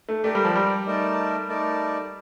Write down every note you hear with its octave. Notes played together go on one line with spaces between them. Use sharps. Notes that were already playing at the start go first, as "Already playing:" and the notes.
A3
A3 G4 A#4 D5
G3
F3
G3
A3 D#4 A#4 D5 A5
A3 D#4 A#4 D5 A5